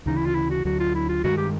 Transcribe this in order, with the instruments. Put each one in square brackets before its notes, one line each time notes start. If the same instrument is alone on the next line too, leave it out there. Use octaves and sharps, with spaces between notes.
[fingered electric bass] D2 C#3 E3 [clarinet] D#4
[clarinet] E4
F4
E4
F#4
[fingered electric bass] D2 D3 F#3 [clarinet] F#4
[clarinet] F4
E4
F4
[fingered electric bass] G2 D#3 G#3 [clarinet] F#4
[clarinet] G4